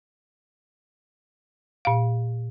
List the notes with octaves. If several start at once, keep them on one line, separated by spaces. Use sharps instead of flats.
A#2 F5